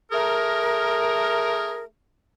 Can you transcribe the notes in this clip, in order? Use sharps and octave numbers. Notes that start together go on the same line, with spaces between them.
A3 G#4 A#4